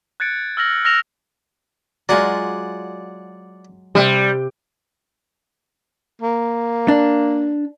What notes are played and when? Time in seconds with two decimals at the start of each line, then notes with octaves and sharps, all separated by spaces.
0.20 F#6 G#6 A6 C#7 D7
0.57 E6 F6 A#6 F#7
0.85 E6 F6 A#6 C#7 E7 F7
2.09 F#3 G#3 F4 D5 F#5 G#5
3.95 C3 G3 C4
6.21 A#3
6.88 D4